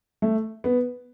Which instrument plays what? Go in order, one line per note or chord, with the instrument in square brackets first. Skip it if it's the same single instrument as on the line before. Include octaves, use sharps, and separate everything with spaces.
[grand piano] A3
B3